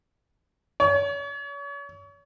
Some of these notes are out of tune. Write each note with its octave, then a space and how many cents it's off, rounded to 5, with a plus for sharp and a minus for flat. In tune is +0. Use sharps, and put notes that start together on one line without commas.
C#5 +35